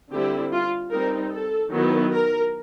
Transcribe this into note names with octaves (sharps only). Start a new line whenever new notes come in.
D3 G3 C4 E4 G4
F4
G3 C4 D#4 A#4
A4
D#3 F#3 B3 E4
A#4